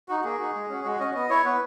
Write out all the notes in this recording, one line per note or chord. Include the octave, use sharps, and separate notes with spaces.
D#4 F#4
F#4
A#3 G#4
D#4 F#4
G#3
C#4 F#4
G#3 F#4
C#4 F#4 D#5
B3 D#5
E4 C#5
B3 B4